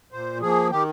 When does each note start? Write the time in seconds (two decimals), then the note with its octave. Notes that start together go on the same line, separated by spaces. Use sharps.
0.12 A#2 C5
0.41 F3 A#3 G#4
0.70 D#3 G4